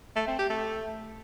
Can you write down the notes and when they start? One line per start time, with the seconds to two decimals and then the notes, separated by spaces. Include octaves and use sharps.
0.16 A3
0.27 C4
0.39 G4
0.50 A3